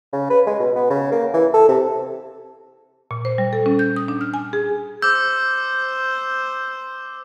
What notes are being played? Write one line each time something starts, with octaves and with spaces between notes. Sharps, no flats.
C#3
B4
G#3
B2
B3
C#3
A#3
E3
A4
C3
A#2
C5
G3
A4
C#4
G6
D#6
D4
F6
G#5
G#4
C5 D6 E6 G6